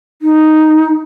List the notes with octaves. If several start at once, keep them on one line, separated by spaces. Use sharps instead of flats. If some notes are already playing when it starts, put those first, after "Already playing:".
D#4